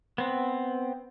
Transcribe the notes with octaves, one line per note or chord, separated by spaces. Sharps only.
B3 C4